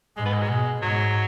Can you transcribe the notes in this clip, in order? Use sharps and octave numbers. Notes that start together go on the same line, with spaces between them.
G#2 G#3
B3
G#3
F#3
B2 G#3
G#2 F#3